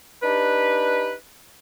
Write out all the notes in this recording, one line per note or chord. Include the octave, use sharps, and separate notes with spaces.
D4 D#4 G4 B4